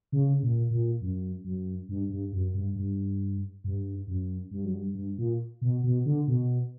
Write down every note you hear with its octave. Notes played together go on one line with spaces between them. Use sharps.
C#3
A#2
A#2
F#2
F#2
G2
G2
F#2
G2
G2
G2
F#2
G2
F#2
G2
G2
A#2
B2
B2
D3
B2